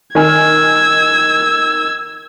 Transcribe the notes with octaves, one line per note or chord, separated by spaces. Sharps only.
D#3 G#5 E6 F6 G#6